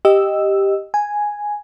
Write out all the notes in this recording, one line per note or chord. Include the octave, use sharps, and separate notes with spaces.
G4 D#5 E6
G#5